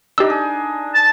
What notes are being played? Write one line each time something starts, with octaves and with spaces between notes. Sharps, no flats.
D4 D#4 G4 E6
G#4
A5